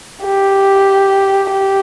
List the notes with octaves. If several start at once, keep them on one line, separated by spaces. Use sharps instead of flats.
G4
G4